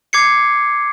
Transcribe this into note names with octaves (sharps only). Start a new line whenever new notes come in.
D6 G#6 C7 C#7